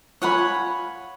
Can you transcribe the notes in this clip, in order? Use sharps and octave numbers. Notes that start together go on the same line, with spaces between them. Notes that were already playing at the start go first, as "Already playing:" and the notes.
F4 C#5 F#5 G#5 B5